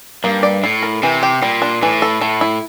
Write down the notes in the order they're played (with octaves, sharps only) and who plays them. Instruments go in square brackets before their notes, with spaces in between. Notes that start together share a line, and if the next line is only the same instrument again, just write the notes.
[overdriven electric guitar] G2 [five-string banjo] A#3
[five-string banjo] D5
[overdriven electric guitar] A2 [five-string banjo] E4
[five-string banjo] A#4
[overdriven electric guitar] C3 [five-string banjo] E3
[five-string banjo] G4
[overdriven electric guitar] A#2 [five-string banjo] G3
[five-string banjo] D4
[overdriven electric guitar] A2 [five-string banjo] E3
[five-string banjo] A4
[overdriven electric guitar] A2 [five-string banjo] A3
[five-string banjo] E4